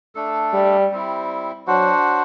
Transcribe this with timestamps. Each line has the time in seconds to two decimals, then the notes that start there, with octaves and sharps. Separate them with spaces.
0.15 A3 D4 A4
0.53 G3
0.91 G3 C4 E4
1.67 F#3 D4 F#4 C5 F#5